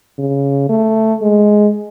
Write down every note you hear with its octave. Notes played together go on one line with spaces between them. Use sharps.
C#3
A3
G#3